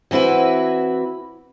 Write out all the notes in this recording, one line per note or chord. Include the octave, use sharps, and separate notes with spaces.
E3 C4 E4 F#4 B4